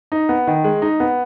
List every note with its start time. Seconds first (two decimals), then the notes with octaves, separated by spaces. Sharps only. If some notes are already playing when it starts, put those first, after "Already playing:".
0.12 D#4
0.29 B3
0.47 D#3
0.64 G#3
0.82 D#4
1.00 B3